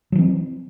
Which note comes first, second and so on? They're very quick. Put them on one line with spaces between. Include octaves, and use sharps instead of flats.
F#3 E3 C4